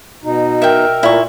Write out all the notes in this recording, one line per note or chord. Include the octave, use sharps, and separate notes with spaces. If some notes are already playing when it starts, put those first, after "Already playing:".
B2 D#4
A#4 E5 G5
A#2 A3 E4 C#6